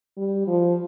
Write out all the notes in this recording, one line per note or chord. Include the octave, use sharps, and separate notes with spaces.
G3
F3